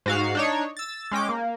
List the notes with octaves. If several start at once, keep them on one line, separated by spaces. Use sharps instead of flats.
G#2 F#4 F5
D4 D#4 C#5
E6 A6
G#3 C#4 G5 D6
A#3